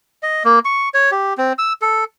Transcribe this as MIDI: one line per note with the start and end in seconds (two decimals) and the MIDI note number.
0.23 0.43 75
0.45 0.59 58
0.65 0.89 85
0.94 1.11 73
1.11 1.34 67
1.38 1.53 60
1.58 1.73 88
1.82 2.04 69